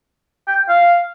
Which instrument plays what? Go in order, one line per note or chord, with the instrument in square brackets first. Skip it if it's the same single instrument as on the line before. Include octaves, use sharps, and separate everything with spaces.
[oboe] G5
F5